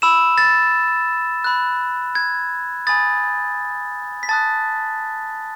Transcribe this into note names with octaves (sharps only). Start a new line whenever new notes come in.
B5 E6 E7
A6
B5 F#6
G#6
G#5 B5 D#6 A6
B6
A5 D#6 F#6 A6